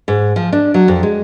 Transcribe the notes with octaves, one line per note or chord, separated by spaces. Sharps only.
G#2
F3
D4
F#3
F2
G#3